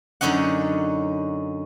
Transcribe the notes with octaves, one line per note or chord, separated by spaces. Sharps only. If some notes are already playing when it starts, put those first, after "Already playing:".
F#2 D3 C#4 D#4 F#5